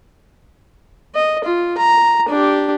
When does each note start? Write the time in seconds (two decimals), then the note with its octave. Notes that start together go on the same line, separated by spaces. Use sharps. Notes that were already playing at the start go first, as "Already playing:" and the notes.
1.15 D#5
1.44 F4
1.78 A#5
2.29 D4 G4